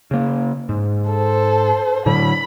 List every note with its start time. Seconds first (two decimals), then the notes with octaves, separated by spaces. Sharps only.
0.11 C#3 A#3
0.69 G#2
1.08 A4 C5
2.06 A2 D3 F#3 B5